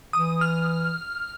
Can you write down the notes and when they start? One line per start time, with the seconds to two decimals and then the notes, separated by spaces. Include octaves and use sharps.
0.13 E3 D#6
0.41 F6